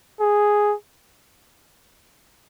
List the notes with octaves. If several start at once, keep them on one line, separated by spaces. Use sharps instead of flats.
G#4